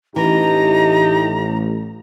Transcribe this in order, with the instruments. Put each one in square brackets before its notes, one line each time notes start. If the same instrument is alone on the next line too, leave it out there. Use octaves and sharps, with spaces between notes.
[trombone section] A1 [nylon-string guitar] E3 [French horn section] A3 D#4 G4 [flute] A#5